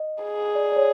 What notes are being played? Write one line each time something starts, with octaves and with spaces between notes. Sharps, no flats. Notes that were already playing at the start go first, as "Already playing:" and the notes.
Already playing: D#5
G#4
D5
D5
C#5